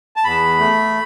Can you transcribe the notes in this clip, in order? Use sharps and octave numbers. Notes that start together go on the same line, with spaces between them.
A5
E2 B5
A3